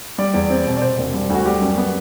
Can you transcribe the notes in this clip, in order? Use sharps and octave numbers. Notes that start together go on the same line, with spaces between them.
G3 D5
E2
C4
B2
D5
C3 C5
E1
G3
D2 F#4
G3 G4
F#2
B3